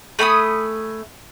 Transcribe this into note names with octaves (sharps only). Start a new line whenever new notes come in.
A3 G#5 B5 D#6